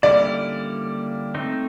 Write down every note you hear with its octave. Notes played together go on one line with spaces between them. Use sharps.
D3 G3 A#3 C#4 E4 D5
A3 C4 D#4